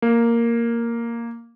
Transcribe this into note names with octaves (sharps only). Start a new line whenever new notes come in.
A#3